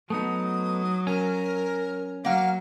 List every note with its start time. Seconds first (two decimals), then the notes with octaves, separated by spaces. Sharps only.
0.10 F#3 A3 B3 D#4 D#6
1.07 C#4 A#4
2.25 F#3 A#3 F5 F#5